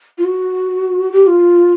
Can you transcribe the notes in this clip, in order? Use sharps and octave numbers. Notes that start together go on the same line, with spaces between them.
F4
F#4
G4
F4